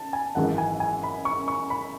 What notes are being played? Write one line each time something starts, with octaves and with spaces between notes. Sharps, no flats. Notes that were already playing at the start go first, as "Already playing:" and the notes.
Already playing: A5
G#5
G#1 F#2 E3 G#3 F#5
G#5
G#5
B5
C#6
C#6
B5